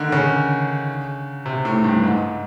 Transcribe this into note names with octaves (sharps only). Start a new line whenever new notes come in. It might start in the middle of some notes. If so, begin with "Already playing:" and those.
Already playing: D3 D#3
C#3
C3
A2
G2
G#2